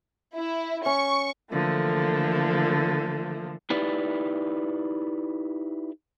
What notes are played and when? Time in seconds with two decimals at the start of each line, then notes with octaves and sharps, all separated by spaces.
0.36 E4
0.86 C#4 C#6
1.50 D3 E3 F3 A3 A#3
3.70 D#4 E4 G4 B4 D5